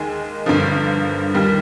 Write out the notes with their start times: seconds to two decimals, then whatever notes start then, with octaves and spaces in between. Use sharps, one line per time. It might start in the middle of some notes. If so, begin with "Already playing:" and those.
Already playing: D#2 D#3 G#3 G#5
0.46 G1 G2 D3 F3
1.34 D#2 D#3 G3